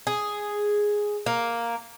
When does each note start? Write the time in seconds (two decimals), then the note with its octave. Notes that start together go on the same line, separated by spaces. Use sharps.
0.07 G#4
1.26 A#3